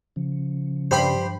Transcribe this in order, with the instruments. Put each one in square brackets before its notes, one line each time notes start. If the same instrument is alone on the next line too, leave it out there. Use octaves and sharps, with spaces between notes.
[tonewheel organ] C#3 [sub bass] F3
[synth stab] G2 B5 C7 [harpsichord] G4 C5